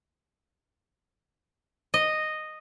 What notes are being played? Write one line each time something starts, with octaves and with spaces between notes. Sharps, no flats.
D#5